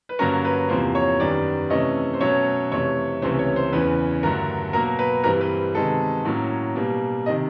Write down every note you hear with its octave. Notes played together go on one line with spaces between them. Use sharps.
B4
G2 D3 F#3 A#3 C#4 A#4
B4
E2 C3 F3 A#3 C5
C#5
F#2 D#3 G3 B3 D5
C3 E3 A3 C#4 D#5
C5
B2 F#3 A3 C#4 C#5
F2 C3 E3 A3 C#5
C#2 C3 E3 A3 C#4 C5
C#5
C5
E2 C#3 E3 B4
G2 D3 F#3 A3 A#4
B2 F#3 A#3 A#4
B4
G2 E3 G3 C4 A#4
B4
C3 D#3 G#3 B3 A4
A2 F#3 A#3 C#4
B2 G3 A#3
C3 D#3 D#5